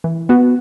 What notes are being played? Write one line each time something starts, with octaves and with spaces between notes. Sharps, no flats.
E3
B3 F#4